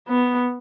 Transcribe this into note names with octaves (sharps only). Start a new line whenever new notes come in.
B3